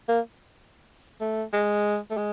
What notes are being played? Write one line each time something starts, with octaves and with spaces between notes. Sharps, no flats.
A#3
A3
G#3
A3
G#3